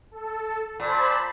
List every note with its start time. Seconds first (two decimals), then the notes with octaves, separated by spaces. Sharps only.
0.11 A4
0.80 A#2 C5 A5 B5